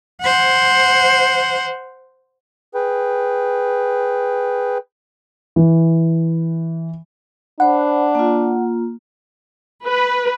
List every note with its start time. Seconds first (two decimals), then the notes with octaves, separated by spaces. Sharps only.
0.22 C5 F#5
2.74 G#4 B4 G5
5.56 E3
7.60 D4 C5 F#5 B5
8.15 A#3 F4
9.87 B4